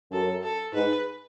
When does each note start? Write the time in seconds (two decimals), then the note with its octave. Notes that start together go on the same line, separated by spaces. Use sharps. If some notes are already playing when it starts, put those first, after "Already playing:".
0.12 F#2 A4
0.43 A4
0.73 G#2 B4